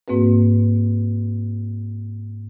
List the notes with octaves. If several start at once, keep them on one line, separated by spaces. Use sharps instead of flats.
G#2 A#3 C4 F#4 B4